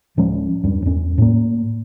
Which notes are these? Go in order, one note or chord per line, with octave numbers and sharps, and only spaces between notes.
D1 F3 G#3 C#4
E2 G2
E2 C#4
A2 A#3